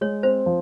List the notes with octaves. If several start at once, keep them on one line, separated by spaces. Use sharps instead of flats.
G#3 C#5
C4 C5
F3